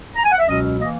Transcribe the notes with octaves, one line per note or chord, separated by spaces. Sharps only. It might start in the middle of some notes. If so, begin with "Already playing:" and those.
A#5
G#5
F#5
E5
C#2 B2 F#3 C#4 D#5
E3 A#3 D#5